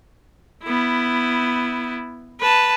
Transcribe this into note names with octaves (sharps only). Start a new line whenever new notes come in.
B3 E4
B4 A5